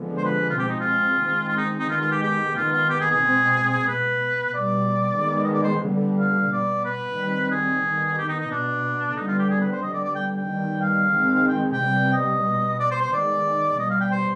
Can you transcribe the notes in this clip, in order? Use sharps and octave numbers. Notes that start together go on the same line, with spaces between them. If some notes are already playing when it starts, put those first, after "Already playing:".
Already playing: D3 F3 G#3 B3
C5
B4
F4
B2 G#3 C4 G4
D#4
F4
D#3 G#3 C4
F4
D#4
D#4
D#3 G#3 B3 F4
F4
G4
G4
D#3 B3 F4
F4
G4
G#4
G#4
B2 G#3 C4
B2 B3 B4
B2 G3 B3 D5
D#3 G#3 B3
D#5
D5
C5
D3 G3 B3
F5
B2 B3 D5
B4
D#3 G3 C4
G#4
D#3 B3
G4
D#4
D#4
B2 B3 D4
D3 G3 B3 D#4
F4
G4
G#4
B4
C5
D3 G3 B3 D#5
D5
D5
G5
G5
D#3 G3 B3
F5
D#3 G#3 C4
G5
G5
C3 G3 B3
D#5
B2 B3
D5
C5
C5
D#3 G#3 B3 D5
B2 G3 B3 D#5
F5
G5
C5